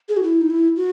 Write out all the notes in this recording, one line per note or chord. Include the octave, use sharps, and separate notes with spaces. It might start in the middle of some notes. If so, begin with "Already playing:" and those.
G#4
F#4
E4
D#4
E4
F#4